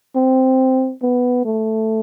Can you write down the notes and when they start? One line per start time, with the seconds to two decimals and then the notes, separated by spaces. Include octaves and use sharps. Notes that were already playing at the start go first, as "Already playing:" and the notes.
0.16 C4
1.03 B3
1.45 A3